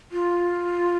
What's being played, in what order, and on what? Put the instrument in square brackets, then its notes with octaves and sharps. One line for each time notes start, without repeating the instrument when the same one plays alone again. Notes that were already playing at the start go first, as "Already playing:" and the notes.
[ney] F4